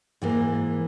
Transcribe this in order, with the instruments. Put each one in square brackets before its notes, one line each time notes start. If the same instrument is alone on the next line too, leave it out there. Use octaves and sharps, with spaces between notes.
[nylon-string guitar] G#2 E3 A#3